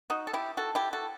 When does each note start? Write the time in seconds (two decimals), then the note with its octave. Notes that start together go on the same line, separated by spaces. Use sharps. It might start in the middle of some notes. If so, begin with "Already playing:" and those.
0.10 D#4 F#4
0.27 A4
0.33 E4 G4
0.57 F#4 A4
0.75 E4 G4
0.93 F#4 A4